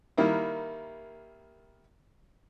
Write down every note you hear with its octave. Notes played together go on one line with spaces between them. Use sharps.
D#3 G3 A#3 E4